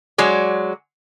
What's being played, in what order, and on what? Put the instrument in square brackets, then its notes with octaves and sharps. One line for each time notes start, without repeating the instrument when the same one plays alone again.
[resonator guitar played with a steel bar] F#3 G#3 D5